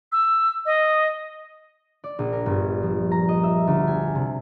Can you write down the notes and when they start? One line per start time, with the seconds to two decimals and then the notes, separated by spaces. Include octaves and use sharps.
0.12 E6
0.66 D#5
2.04 D5
2.19 A#1
2.33 A#4
2.46 G1
2.83 F3
3.11 A#5
3.28 D#5
3.43 E5
3.67 D2
3.87 G#5
4.15 C3